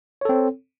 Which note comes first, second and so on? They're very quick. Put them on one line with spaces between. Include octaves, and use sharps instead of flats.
C#5 A4 C4